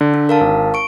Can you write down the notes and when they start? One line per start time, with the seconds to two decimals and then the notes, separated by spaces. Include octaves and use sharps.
0.01 D3
0.14 D4
0.29 A#4 F5 A5
0.41 G#1
0.74 C#6 D7